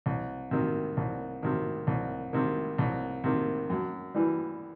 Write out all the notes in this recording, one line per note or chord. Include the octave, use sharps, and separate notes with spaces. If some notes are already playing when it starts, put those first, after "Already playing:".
C2
C3 D#3
C2
C3 D#3
C2
C3 D#3
C2
C3 D#3
F#2
E3 G3